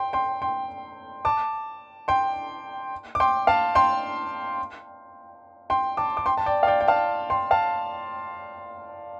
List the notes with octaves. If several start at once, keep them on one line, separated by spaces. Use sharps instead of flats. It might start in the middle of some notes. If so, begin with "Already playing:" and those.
Already playing: G5 C6
G5 C6
G5 C6
A5 D6
G5 C6
D6
G5 C6
F5 A5
G5 C6
G5 C6
A5 D6
D6
G5 C6
A5
D5 G5
F5
D5 G5
G5
F5 A5
G5 C6
F5 A5